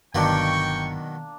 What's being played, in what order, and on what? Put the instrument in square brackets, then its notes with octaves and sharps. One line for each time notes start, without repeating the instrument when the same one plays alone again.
[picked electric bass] G1 [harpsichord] B2 D#3 F#3 [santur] A#3 D4 [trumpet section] G5 C#6